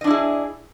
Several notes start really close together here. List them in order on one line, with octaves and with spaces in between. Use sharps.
D#5 D4 E4 G#4